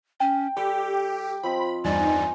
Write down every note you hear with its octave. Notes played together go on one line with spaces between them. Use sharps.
C#4 G5
G3 G4 A4 D6
F3 C4 D#5 B5
E2 G2 D#4 D5 G#5